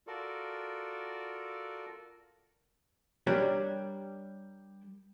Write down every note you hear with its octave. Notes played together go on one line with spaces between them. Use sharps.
F4 F#4 A4 A#4 D5
G3 D4 G4 A#4 C#5 D5